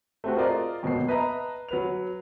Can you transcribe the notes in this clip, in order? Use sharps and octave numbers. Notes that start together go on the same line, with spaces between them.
A3 C4 F#4
F4 G#4 A#4 C5 D5 D#5
G#1 B2 F#3 A#3 C7
B4 D#5 E5 A5 A#5
F#3 B4 F7